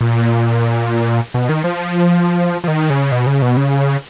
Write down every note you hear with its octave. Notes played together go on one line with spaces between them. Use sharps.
A#2
B2
D#3
F3
F3
D#3
C#3
B2
C#3
B2
C#3